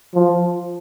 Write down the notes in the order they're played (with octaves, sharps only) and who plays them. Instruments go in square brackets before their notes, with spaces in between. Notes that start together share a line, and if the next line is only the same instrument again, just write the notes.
[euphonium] F3